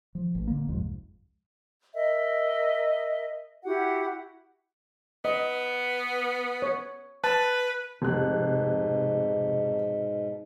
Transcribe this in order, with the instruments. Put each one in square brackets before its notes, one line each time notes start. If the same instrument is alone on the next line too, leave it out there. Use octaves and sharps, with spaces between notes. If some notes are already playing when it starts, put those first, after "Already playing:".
[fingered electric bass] F3
A1
D3 A#3
F#1 C2 F2 G#2
[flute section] A#4 D#5 E5
E4 F#4 G4 F#5
[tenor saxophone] B3 [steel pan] D#5
[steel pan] C#5
[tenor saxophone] B4 [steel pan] A5
[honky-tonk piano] F1 F#6 [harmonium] G#2 B2